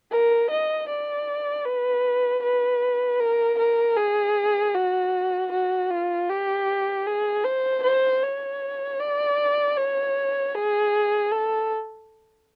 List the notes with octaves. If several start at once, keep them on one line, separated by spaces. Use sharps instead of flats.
A#4
D#5
D5
B4
B4
A#4
A#4
G#4
F#4
F#4
F4
G4
G#4
C5
C5
C#5
D5
C#5
G#4
A4